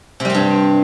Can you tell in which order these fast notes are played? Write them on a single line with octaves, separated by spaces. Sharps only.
C3 G3 C4 G2